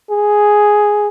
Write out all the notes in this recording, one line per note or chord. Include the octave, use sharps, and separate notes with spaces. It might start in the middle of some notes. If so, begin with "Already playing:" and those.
G#4